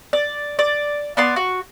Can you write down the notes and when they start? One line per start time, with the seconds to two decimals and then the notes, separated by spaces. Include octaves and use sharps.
0.13 D5
0.59 D5
1.17 B3 D5 C6
1.36 F#4